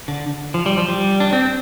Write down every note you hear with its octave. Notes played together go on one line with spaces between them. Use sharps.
D3
F3
G3
F3
G3
D4
C4